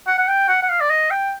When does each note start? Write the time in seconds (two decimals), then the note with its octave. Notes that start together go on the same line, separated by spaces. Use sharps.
0.07 F#5
0.18 F#5
0.28 G5
0.48 F#5
0.63 F#5
0.69 F5
0.80 D5
0.90 D#5
1.11 G5